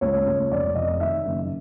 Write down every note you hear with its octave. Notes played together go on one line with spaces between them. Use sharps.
C#2 C#5
C#2
F1 D5
F1 D#5
D#3 E5
F#1